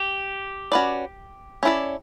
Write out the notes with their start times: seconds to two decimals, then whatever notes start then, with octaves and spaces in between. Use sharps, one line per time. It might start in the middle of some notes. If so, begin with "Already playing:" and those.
Already playing: G4
0.72 C#4 F#4 B4 D5
1.63 C#4 E4 A4 D5